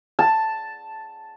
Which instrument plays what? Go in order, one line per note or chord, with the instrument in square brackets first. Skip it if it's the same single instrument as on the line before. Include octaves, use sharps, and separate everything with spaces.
[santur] A5